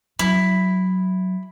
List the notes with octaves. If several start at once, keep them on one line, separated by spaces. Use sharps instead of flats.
F#3 E4